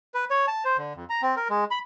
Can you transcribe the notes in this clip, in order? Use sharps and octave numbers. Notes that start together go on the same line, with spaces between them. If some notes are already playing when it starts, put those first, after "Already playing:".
B4
C#5
A5
C5
D3
F2
A#5
C4
A#4
G#3
B5